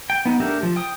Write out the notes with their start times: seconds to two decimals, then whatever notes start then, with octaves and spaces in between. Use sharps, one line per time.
0.10 G5
0.25 B3 D#4
0.40 A3 D4 G4 A#4 E5
0.63 F3
0.76 G5 D#6